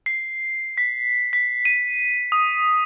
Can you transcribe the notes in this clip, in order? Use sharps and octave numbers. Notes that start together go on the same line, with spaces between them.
C7
B6
B6
D#7
D#6